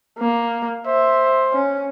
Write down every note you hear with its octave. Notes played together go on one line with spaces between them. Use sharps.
A#3
C5 E5
C#4